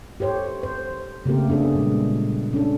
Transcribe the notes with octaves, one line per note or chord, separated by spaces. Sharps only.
G4 A4 C5 C#5
C5
C#3 A3 A#3 C4 G4 A#4
B3 D4 G#4 A4
A#2 G3 G#3
C#4 D4 A4